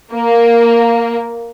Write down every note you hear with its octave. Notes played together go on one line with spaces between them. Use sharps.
A#3